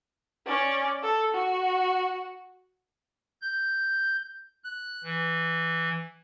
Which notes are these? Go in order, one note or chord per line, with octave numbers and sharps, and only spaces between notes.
C#4 D5
A4
F#4
G6
F#6
E3